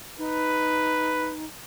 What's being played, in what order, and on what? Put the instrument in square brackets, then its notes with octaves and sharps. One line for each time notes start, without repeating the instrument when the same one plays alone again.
[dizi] D#4 [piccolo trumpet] B4